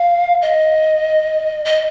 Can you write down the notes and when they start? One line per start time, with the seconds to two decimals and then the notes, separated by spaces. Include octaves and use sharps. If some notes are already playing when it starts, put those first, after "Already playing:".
Already playing: F5
0.42 D#5
1.65 D#5